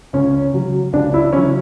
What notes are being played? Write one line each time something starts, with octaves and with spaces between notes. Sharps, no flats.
C#2 C#4
C#3 F#3
C#2 D4
E4
C#3 F#3 C#4